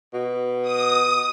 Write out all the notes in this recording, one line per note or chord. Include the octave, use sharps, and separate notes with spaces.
B2
D#6